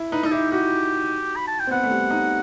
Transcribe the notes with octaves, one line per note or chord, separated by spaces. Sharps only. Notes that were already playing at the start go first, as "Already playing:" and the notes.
Already playing: E4
D#4 B4
D#4 A4
E4 G4
F#4 G4
B5
A5
G5
C4
B3 F#5
A3
G3
D#4